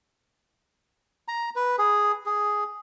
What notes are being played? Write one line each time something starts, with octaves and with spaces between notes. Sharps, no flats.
A#5
B4
G#4
G#4